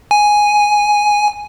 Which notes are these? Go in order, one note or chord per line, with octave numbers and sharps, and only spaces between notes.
G#5